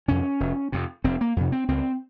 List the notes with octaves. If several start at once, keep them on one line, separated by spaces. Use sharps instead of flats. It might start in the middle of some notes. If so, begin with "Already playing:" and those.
F2 C3 C#4
F1
F2 C3
F1 C4
A#3
F2 C3
C4
C#2 C4